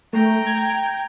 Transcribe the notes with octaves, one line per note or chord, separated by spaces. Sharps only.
A3 G5 A#5
G#6